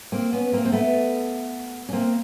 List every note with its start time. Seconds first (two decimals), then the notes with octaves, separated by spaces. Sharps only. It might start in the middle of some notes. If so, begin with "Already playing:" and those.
0.12 A#3 C4
0.33 B3 C#4
0.52 A#3 C4
0.65 C4
0.72 A3 B3
1.89 C#4
1.93 A#3 C4